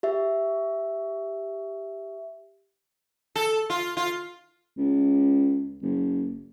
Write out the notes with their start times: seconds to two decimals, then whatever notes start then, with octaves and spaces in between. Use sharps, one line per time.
0.03 G4 E5
3.36 A4
3.70 F4
3.97 F4
4.77 C#2
5.82 F#1